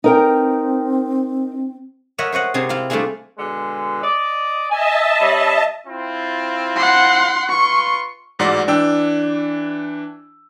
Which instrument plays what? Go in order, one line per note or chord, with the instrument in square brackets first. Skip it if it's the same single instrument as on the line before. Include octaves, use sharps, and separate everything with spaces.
[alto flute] C4 [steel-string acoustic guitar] D#4 A#4 G5
[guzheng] A#4 C#5 D#5 E5 F#5
C5 C#5 D#5 F#5
C3 C4 D#4 G#4
E4 F4
G3 A3 D4 E4 F4 G#4
[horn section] B2 D3 G#3
D5 D#5
[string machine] D#5 E5 A5 [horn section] G#5
[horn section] G3 C#4 B5
[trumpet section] C4 E4 F4
[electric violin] F#5 C6
[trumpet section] F4 B4 C6 [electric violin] C#6
[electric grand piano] A1 G#2 F#4 D5
E3 D4 G5 E6